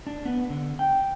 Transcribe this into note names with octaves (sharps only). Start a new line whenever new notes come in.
D4
B3
D3
G5